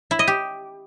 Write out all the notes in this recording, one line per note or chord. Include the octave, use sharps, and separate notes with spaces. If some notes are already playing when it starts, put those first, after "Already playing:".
E4
D#5
G4